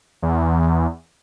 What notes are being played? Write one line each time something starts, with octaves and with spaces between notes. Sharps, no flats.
E2